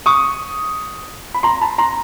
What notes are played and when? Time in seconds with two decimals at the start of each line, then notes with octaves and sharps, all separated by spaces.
0.06 C#6 D#6
1.34 B5
1.43 A#5 C6
1.61 A5 B5
1.78 A#5 C6